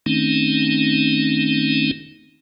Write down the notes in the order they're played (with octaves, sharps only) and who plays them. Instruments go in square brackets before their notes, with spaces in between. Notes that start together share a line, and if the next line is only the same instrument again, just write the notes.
[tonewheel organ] D#3 A3 C4 C#4 D#4